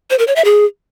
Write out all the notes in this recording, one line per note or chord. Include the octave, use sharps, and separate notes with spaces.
C5
A#4
C#5
E5
G#4